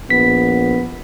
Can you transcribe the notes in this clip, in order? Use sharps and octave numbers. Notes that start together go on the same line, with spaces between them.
A#1 B3 B6